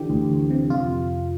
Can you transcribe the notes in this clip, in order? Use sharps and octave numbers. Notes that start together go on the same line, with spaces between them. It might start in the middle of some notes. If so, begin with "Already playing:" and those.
Already playing: D3 E3 G4
D2
D2
C3
F2 F4